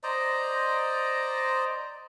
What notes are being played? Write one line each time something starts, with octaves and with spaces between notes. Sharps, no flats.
C5 D5 D#5 A#5